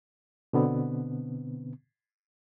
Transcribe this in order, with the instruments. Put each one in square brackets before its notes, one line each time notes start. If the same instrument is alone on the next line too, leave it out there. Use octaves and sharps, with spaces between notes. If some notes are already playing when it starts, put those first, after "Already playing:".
[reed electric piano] B2 D3 B3 C4